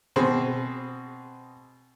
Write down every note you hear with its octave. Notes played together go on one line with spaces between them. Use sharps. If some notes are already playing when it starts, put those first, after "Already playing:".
B2 C4 G#4